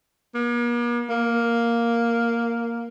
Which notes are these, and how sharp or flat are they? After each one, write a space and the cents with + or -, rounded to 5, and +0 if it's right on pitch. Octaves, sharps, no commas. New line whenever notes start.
A#3 +45
A#3 +0